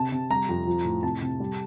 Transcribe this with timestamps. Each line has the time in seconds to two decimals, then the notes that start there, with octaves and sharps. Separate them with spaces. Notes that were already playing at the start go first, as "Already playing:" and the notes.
Already playing: C3 A5
0.12 C3
0.30 G3 A#5
0.49 F2
0.67 F3
0.85 A2
1.03 C3 A5
1.22 C3
1.40 G3